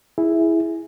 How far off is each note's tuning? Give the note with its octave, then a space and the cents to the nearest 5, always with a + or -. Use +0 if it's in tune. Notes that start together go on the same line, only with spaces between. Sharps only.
E4 +0 G#4 +0